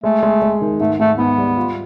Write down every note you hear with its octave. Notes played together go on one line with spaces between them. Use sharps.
G#3 A3
G#3
G#3
D#3
G#2 A3
G#2 A3
G#2 B3
G3
F4